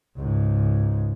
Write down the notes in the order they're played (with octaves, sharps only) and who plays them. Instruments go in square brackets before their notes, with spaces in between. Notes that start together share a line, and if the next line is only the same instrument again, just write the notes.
[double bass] C#2 G#2